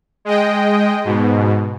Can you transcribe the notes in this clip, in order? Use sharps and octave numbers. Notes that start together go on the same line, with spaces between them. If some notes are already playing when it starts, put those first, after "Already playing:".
G#3 D#5 G5
G#2 B2